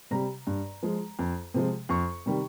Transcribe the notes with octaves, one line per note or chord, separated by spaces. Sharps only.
C3 G3 A#5
G2
F3 G#3
F2
C3 F3 G#3
F2 C#6
C3 D#3 G3